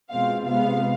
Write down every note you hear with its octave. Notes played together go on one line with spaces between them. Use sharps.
B2 G#3 C4 F4 F5
C3 G#3 B3 F5